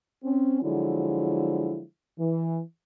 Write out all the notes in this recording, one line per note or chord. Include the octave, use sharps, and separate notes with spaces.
C4 C#4
D3 F3 F#3 G#3 E4
E3